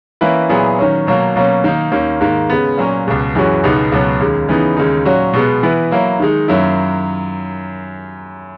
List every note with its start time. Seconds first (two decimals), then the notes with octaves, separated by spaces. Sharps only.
0.21 E3 A#3 C#4 E4 B4
0.49 A#2 F#3 B3 E4 G#4
0.79 D#3 F#3 C#4
1.07 B2 F#3 A#3
1.36 B2 F#3 A#3 C#4
1.64 D#3 A#3 D#4
1.92 D#2 D#3 A#3 C#4
2.21 G#2 D#3 A#3
2.50 C#3 G#3 B3
2.77 A#2 F#3 A#3 C#4
3.06 C#2 B2 G#3
3.35 F#2 E3 G#3 C#4 F#4
3.64 C#2 B2 G#3 B3 D#4
3.92 C#2 B2 F#3 B3
4.20 D#2 C#3 G#3
4.48 C#3 E3 B3 D#4
4.77 D#2 C#3 G#3 D#4
5.05 A#2 F#3 C#4 F#4
5.33 B2 G#3 B3
5.63 E3 B3 E4 B4
5.91 F#3 A#3 E4
6.20 D#3 G#3 D#4
6.48 F#2 D#3 F#3 A#3 E4